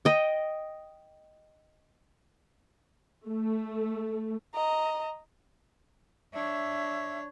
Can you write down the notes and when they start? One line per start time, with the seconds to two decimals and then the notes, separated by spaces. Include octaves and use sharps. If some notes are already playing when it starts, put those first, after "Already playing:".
0.05 D#5 G5
3.28 A3
4.55 D#5 A#5
6.33 D4 C#5 E5